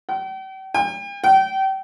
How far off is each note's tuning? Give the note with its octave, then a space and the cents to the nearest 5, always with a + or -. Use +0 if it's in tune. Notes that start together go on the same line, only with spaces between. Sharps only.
G5 -45
G5 +40
G5 -30